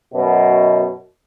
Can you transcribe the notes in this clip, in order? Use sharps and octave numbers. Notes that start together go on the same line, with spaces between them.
F#2 B2